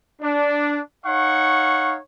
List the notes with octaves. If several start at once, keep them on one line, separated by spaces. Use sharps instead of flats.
D4
D#4 C#5 F5 F#5 C#6